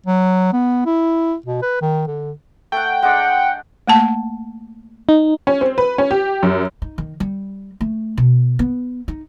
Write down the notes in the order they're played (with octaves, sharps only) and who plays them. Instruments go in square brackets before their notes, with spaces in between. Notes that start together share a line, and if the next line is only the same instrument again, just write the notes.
[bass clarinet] F#3
B3
E4
B2
B4
D#3
D3
[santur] A3 F#5 [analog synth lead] G5
[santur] G#3 D4 [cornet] F#5
[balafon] A3 A#3 A5
[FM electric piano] D#4
[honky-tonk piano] C#4
C4
B4
C#4
G4
F#2
[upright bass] D#4
D#3
G3
A3
B2
B3
D#4